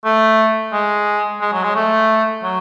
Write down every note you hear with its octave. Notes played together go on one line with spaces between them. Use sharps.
A3
G#3
G#3
F#3
G#3
A3
F#3